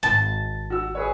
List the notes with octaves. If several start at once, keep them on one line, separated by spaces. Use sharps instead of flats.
G#1 A5
F#4 E6
G#4 B4 C#5